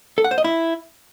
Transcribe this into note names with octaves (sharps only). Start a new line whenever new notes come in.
A4
F#5
C5
D#5
E4